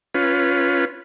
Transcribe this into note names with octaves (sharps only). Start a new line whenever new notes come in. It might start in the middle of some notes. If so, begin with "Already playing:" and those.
C#4 F4 B4